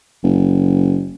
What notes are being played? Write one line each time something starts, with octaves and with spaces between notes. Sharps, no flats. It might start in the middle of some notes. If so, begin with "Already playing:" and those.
F#1